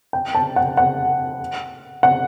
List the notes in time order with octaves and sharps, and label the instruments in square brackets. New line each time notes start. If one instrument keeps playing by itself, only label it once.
[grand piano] G5
A5
F#5
F#5
F#5